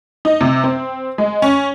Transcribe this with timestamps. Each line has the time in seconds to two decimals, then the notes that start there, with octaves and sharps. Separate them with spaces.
0.25 D#4
0.41 C3
0.64 C4
1.18 G#3
1.42 C#4